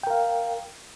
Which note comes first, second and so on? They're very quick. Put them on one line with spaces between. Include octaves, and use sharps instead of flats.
G5 A#4 F5